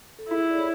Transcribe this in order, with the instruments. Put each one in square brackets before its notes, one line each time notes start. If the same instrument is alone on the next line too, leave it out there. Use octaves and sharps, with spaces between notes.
[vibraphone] A4
[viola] E4 [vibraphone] G#4
[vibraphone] D5
C#5